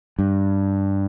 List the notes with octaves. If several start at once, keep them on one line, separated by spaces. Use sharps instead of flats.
G2